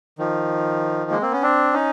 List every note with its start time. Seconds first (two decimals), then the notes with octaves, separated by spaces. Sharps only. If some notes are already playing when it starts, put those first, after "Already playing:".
0.18 D#3 F3
1.11 G#3 A#3
1.21 A#3 C4
1.32 B3 C#4
1.42 C4 D4
1.73 C#4 D#4